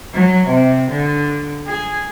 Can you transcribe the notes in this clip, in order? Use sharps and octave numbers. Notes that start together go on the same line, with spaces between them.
F#3
C3
D3
G#4